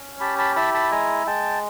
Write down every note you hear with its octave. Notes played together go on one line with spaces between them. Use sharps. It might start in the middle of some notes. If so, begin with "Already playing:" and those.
Already playing: C#4
G4 A5 B5
A5 B5
E4 A5 B5
A5 B5
G#3 G#5 A#5
G#3 G5 A5